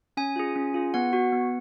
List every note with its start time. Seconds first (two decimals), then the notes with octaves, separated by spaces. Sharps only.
0.17 C#4 G#5
0.36 F4 G#4
0.56 C#4
0.74 F4 G#4
0.94 B3 F#5
1.13 F#4
1.33 B3